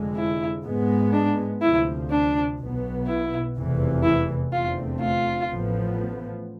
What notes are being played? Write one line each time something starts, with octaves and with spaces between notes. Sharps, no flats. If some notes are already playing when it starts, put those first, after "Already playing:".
Already playing: F1 F2 D3 G#3
E4
G#2 G#3 B3
D4
D2 C3 F3 E4
D4
B1 B2 B3
E4
F1 E2 C3 E3
E4
F1 E2 D3 A3 C4 F4
F4
A1 A2 F3 B3